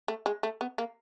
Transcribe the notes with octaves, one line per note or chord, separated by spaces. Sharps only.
A3
G#3
A3
B3
A#3